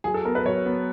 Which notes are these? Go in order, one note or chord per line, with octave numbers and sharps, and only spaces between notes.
F#3 G#4
A4
B3 A#4
B4
F#3 C#5
B3